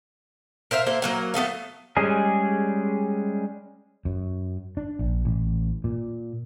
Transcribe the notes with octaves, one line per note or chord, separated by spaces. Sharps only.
A#4 C5 E5 F5
A#3 A4 C5 E5
F#3 A#3 F#5
A3 B3 A4 F5
G3 G#3 C#4 G#4
F#2
D4
A#1
A1
A#2